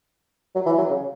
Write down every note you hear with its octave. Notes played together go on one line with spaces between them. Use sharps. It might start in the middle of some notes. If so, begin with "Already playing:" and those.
F#3
E3
F#3
C#3